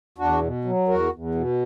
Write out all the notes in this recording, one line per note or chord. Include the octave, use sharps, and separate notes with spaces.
E2 D4 F#4
B2
F#3
E2 F#4 A#4
E2
B2